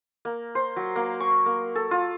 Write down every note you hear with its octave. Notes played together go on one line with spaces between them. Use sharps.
A#3
C5
F#3
A#3
C#6
A#3
A4
F4